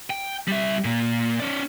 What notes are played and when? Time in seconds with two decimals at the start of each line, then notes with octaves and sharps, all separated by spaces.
0.10 G5
0.48 G3 E5
0.85 A#2 A#3
1.40 C#4 D5